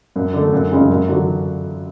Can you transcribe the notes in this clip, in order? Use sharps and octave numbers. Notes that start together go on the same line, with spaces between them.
F#2
D3
A3
F#2
C#3 G#3 C#4
F#2
D3 F#3